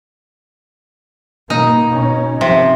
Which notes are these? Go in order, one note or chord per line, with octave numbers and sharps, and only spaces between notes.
B2 A#3 D#4
B2 C#4
C3 F3